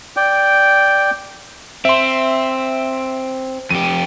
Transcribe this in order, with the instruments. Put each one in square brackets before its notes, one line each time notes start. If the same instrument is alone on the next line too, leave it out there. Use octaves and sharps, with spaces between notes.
[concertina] D5 G5
[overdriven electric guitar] C4 [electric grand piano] E5 C6
[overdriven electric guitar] F2 G4 [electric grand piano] D#7